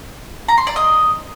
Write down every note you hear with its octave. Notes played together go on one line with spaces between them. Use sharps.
A#5
C6
D5
D#5